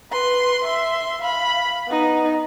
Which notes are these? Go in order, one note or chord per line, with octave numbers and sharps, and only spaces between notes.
B4 C6
E5 C6
F5 B5
B3 D#4